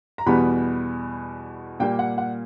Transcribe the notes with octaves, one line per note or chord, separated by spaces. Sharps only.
A#5
E2 B2 G3 B3 B5
A#2 G3 A#3 G5
F#5
F#5